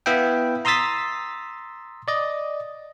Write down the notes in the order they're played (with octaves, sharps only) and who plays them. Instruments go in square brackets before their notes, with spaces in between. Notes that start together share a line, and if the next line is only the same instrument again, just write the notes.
[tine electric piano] B3 E4 E5 F5 G5
A#5 C6 D#6 E6 A6 B6
D5 D#5